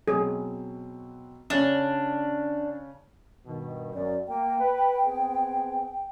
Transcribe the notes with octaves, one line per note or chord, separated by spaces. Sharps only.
B2 F#3 C4 G#4
C#3 C#4 D4
G2 B2 D#3
F#2 D5
A#3 G5
B4
B3 C4 G#4